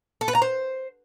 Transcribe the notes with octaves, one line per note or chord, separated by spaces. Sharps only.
A4
B4
A#5
C5